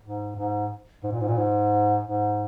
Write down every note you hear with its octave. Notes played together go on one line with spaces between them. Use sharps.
G#2
G#2
G#2
A#2
G#2
A#2
G#2
G#2